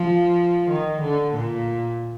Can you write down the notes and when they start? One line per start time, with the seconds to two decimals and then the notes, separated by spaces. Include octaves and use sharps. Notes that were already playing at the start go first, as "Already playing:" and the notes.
Already playing: F3
0.70 D#3
1.01 D3
1.34 A#2